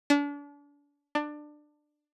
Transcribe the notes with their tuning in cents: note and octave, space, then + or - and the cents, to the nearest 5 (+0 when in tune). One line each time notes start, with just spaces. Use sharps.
D4 -35
D4 +20